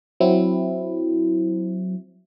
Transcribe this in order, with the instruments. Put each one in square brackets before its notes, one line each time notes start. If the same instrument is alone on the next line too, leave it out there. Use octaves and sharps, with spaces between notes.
[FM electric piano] F#3 C4 E4